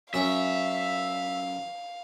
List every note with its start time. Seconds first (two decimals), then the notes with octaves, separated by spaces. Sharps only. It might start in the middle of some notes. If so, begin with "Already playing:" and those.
0.14 F#2 C#4 E5 F5